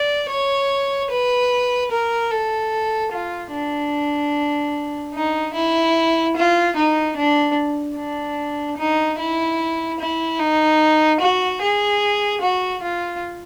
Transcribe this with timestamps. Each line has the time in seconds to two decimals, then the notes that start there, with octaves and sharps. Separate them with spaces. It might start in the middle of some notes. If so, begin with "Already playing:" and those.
Already playing: D5
0.30 C#5
1.11 B4
1.91 A#4
2.31 A4
3.12 F4
3.52 D4
5.14 D#4
5.54 E4
6.36 F4
6.76 D#4
7.17 D4
7.96 D4
8.77 D#4
9.19 E4
10.00 E4
10.39 D#4
11.20 F#4
11.61 G#4
12.41 F#4
12.82 F4